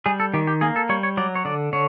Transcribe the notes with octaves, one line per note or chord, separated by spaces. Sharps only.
G3 G#4
A4
D#3 G4
G4
A#3 G#4
A4
G3 C#5
C#5
F#3 D5
C#5
D3 D5
D3 C#5